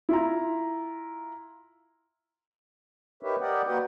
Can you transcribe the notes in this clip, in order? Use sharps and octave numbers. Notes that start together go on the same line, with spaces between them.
E4 F4 A#5
D#4 G4 A#4 B4 C#5 E5
G4 A#4 D5 D#5 F#5 G5
A#3 F#4 B4 F#5 G5